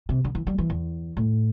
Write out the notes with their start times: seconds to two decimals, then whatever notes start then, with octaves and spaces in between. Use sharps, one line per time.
0.09 C3
0.24 D3
0.35 E3
0.47 G3
0.58 E3
0.70 E2
1.17 A2